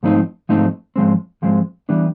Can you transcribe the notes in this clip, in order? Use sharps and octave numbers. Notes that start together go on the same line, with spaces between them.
G#2 F3 A3 C4 D#4
G#2 F3 A3 C4 D#4
G#2 F3 G#3 C4
G#2 F3 G#3 C4
E3 G3 B3 D4